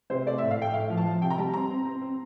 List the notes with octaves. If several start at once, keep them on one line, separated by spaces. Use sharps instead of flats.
C3 C5
A3 D5
A2 E5
F5
A3 G5
A2 F5
F3
A5
F3
C3 G5
A#5
G3 A5
C4 A#5
C4
C4
C4